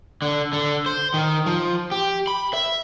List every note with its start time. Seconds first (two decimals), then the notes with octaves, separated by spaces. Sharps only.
0.22 D3
0.53 D3
0.86 C5
1.14 D#3
1.46 F3
1.91 G4
2.27 B5
2.54 E5